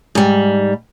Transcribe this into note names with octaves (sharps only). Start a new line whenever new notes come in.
G#2 G3